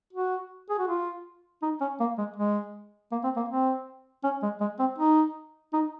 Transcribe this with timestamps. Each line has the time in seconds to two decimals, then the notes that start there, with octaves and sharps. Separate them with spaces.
0.13 F#4
0.70 G#4
0.79 F#4
0.87 F4
1.62 D#4
1.81 C#4
2.00 A#3
2.18 G#3
2.37 G#3
3.12 A#3
3.24 C4
3.36 A#3
3.49 C4
4.24 C#4
4.43 G#3
4.61 G#3
4.79 C4
4.98 D#4
5.73 D#4